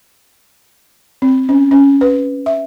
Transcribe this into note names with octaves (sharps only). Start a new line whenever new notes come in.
C4
C#4
C#4
B4
E5